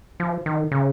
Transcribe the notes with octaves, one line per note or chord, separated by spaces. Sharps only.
F3
D#3
C#3